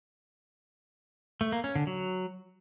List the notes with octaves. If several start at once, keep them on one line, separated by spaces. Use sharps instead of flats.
A3
A#3
C#4
D3
F#3